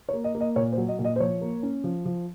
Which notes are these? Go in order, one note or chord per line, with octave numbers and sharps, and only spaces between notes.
C#5
A#3
D#5
A#3
D#5
A#2 C#5
C5
F#3
D#5
A#2
D#5
C5
F3 C#5
A#3
C#4
F3
F3